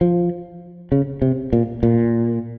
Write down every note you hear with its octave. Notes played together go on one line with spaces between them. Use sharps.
F3
C#3
C3
A#2
A#2